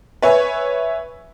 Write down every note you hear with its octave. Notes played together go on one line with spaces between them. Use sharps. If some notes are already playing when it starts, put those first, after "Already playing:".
B4 C#5 E5 G#5